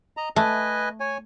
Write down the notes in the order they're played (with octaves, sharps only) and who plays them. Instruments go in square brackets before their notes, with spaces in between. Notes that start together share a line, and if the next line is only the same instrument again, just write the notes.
[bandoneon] D#5 A#5
[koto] A3 [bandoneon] B4 D#5 G#5
[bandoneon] C#5 G#5